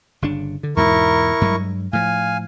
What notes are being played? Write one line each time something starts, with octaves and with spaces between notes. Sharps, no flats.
G1 C#3 D4
D3
E2 G#2 B2 E4 A#4 C#6
G2 F#3 G#3
A2 F3 F5 G#5